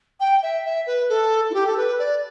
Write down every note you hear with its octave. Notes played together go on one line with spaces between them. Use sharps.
G5
E5
E5
B4
A4
E4
G4
A4
B4
D5